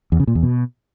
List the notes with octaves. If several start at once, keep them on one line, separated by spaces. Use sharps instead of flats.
E2
C#3
A#2
E2
B2